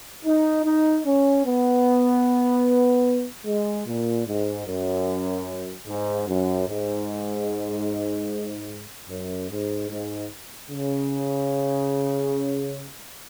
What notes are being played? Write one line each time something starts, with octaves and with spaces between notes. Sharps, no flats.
D#4
D#4
C#4
B3
G#3
A#2
G#2
F#2
G#2
F#2
G#2
F#2
G#2
G#2
C#3